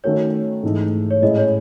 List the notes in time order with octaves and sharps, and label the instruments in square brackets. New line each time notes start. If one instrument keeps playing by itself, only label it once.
[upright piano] D#3 A3 C#4 F#4 A4 [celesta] C#5
[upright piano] G#2 E3 A3 D#4
[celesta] C#5
[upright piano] A2 G#3 C#4 E4 [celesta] D#5
[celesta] C#5